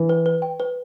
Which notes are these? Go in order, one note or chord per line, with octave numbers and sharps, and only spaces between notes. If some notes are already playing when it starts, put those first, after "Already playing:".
Already playing: E3
B4
B4
G5
B4